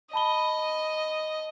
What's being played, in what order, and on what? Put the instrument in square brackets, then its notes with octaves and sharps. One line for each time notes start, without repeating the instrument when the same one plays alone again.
[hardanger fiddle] D#5 [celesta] A5 B5 G7